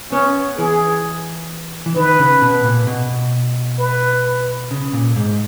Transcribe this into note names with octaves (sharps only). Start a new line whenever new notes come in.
B3 C#4
E3 G#4
E3
D#3 B4
C#3
B2
A#2
B2
B4
C#3
A#2
G#2